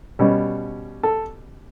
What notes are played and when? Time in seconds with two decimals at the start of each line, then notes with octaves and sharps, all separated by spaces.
0.19 B2 G3 C#4
1.03 A4